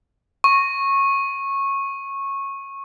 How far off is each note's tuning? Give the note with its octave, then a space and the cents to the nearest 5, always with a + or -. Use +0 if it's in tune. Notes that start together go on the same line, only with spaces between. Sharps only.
C#6 -15